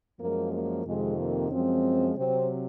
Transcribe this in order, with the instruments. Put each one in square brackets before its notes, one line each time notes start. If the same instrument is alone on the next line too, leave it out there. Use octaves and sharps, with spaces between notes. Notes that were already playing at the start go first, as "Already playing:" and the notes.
[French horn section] F#2 F3 G#3 A#3
A#3
F2 C3 D#3 G#3
A#3
F#2 F3 G#3 C4
C3 F#3 C4